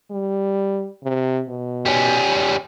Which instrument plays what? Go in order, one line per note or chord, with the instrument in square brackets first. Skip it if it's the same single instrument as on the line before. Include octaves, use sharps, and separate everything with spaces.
[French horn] G3
C3
B2
[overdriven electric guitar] G3 C#4